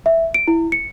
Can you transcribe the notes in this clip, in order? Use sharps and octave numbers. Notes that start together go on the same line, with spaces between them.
E5
D7
E4
C#7